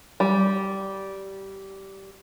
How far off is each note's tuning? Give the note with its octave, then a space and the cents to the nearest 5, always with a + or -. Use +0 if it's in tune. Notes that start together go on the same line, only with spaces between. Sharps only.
G3 -15